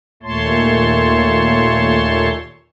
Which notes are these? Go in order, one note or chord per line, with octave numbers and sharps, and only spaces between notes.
D#2 A#2 A3 C#5 A5 C6